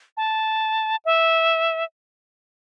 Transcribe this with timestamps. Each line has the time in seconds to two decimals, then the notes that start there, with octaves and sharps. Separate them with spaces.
0.17 A5
1.05 E5